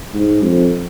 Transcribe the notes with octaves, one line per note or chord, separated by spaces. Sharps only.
G#2
F2